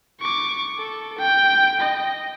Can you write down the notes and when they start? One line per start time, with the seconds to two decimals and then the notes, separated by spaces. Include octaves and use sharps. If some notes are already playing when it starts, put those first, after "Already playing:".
0.21 C#6 D6
0.79 A4
1.18 G5
1.80 D#5